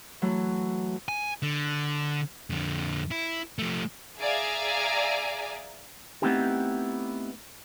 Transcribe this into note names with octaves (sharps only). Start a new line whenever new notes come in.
E3 F#3 A3
G#5
D3
F2 D3
E4
F3 A3
G#4 D5 E5 F5 G#5 A#5
A3 B3 C4 D#4 E4 G4